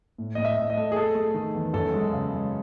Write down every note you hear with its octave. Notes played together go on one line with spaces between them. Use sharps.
A2
A2 D#5
E5
A2
D#5
A3
G#4
A3 A4
A3
D#3
E2
F#2 A4
G#3
C#3
G#3